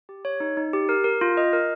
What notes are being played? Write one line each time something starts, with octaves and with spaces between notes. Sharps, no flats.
G4
C#5
D#4
D#4
G4
A#4
A#4
F4
D#5
A#4